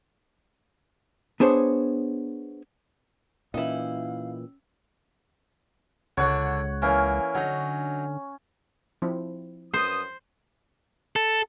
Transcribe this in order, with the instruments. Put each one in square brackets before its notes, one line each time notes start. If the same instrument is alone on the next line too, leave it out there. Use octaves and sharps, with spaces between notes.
[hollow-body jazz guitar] B3 D4 G#4 C5 C#5
[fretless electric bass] A#2 E3 [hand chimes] C#4 E6 [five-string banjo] D#4 E4 [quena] F5
[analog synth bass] C#2 [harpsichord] D3 D4 [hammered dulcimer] C#5 F#5
[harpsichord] E3 A#3 [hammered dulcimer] C#4
[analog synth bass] D3 [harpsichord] F#3 D#4
[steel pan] F3 C4 E4
[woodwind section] F#2 B4 D#6 [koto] C5
[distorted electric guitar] A4